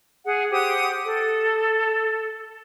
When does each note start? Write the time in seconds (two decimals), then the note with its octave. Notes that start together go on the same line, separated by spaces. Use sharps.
0.25 G#4 F#5
0.52 G4 C5 F#5 D#6
1.05 A4